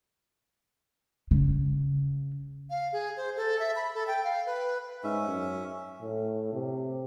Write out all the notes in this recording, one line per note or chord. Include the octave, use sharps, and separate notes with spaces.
C#3
F5
G#4
C5
A4
E5
B5
A4
G5
F5
B4
G#2 C#4 E5
F#2
A2
C3